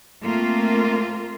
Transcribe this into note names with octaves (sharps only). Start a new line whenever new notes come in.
A3 A#3 C4 F4